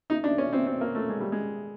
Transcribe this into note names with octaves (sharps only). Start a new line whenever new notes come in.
D#4
D4
C#4
C4
C4
A#3
A3
G#3
G3
G#3